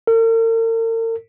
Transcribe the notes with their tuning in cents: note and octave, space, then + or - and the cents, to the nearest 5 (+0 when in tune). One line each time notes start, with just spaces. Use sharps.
A#4 -45